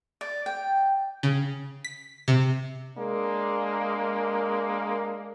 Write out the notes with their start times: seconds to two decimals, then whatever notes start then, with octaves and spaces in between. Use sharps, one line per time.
0.21 D5
0.46 G5
1.23 C#3
1.84 B6
2.28 C3
2.98 G#3 A#3 D4 A#4